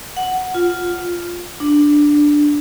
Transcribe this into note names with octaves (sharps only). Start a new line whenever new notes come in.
F#5
F4
D4